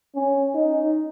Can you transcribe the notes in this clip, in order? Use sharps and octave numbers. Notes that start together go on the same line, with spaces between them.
C#4
D#4